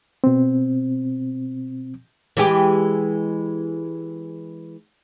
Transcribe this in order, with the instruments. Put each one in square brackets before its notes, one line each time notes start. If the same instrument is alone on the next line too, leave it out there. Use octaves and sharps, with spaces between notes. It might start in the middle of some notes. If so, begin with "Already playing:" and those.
[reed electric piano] B2 C4
[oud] E3 G#3 G4